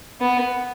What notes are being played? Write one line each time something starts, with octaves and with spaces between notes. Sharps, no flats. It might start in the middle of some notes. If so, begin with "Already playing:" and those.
B3